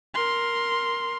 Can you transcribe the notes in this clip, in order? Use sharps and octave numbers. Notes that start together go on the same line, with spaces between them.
A#4 C6